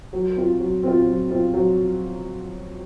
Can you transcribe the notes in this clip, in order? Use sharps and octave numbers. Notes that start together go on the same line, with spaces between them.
F#3
C4 F4
F#3
C4 F4
F#3
C4 F4
F#3